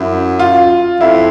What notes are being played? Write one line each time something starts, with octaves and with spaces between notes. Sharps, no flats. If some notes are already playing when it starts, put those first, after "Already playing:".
Already playing: F#2 E4
F4
F2 E4